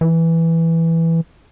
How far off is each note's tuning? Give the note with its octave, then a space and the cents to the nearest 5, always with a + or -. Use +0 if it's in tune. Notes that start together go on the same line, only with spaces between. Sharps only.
E3 +0